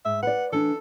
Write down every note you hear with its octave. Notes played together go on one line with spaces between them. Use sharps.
G#2 E5
B4 D5 F#5
E3 D4 A4